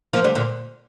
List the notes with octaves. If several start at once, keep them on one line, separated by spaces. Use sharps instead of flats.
F3 A#3
D3 G3
A#2 D3